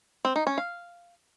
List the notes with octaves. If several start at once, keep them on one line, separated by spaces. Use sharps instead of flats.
C4
D#4
C#4
F5